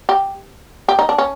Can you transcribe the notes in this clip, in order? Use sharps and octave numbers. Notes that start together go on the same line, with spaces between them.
G4
G4
D#4
D4
C#4